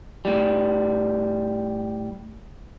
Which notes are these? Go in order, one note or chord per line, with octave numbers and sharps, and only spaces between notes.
A2 G3